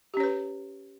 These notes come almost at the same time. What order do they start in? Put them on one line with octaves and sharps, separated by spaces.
G4 C#4 C#5 B4